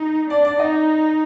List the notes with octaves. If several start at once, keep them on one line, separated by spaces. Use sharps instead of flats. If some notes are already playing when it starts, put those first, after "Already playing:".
Already playing: D#4
D4 D5
D5
D#4 D#5